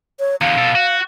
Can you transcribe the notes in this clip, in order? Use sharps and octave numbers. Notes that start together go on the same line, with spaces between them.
C#5
E2 D3 F5
B2 A4
F#4